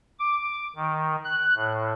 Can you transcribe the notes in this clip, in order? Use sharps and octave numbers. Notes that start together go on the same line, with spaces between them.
D6
D#3
F#6
A2